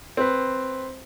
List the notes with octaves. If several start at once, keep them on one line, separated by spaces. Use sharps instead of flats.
C4 B4